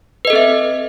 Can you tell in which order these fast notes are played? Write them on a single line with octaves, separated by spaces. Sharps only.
B4 D#5 A4 C4 E5